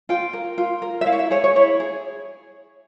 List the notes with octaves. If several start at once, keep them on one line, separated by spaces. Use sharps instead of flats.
F4 G5
A#4
F4
A#4
E5
E4 F5
C#5
E5
G#4 C#5
C#5
E4 C#5
G#4